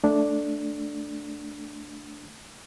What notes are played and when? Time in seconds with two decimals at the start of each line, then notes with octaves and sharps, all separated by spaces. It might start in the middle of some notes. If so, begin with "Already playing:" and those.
0.04 A3 D4